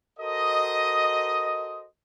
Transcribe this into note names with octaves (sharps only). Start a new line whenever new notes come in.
F#4 A4 A#4 C5 D#5